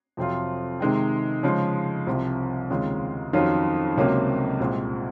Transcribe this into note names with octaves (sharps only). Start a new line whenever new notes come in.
F2 C3 F#3 C4 F4
C3 D#3 G#3 C4
C#3 F3 G#3
C2 C3 F3
D#2 C#3 G#3 C4 F4
F2 D#3 F#3 C#4 F4
C#2 C3 F#3 A#3 C#4
C2 A#2 G#3 C4